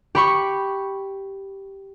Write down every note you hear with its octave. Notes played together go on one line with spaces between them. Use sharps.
G4 B5 C#6